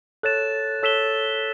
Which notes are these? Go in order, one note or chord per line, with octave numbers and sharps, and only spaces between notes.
A4 C#5 F#6 A6 E7
A4 C#5 E6 B6 E7 G7